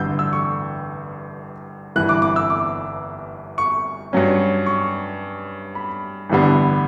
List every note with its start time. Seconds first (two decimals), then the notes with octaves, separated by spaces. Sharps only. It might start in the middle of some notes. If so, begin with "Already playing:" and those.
Already playing: A1 G2 D3 E6 G6
0.19 E6
0.33 C#6
1.96 G1 G2 E3 F#6
2.09 D6
2.22 D6
2.36 E6
2.50 D6
3.58 C#6
4.13 G2 F#3 C#4
4.66 C#6
5.75 B5
6.30 A1 G2 D3 G3 B3